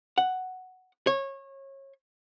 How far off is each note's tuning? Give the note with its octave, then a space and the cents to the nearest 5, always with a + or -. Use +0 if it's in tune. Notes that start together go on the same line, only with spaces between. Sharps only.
F#5 +5
C#5 -25